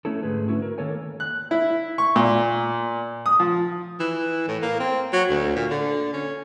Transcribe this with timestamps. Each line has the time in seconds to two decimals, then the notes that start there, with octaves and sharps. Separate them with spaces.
0.05 A3 C#4 E4 A4
0.23 G#2 D3 A3 G#4 B4
0.48 A3 C#4 E4 F#4
0.62 A#4
0.78 D#3 A#3 A4 A#4 C#5 G#5
1.20 F#6
1.51 E4
1.98 C#6
2.16 A#2
3.26 D#6
3.40 F3
4.00 E3
4.48 A2
4.62 A#3
4.80 C4
5.13 F#3
5.30 D2
5.56 A#2
5.70 D3
6.13 C#4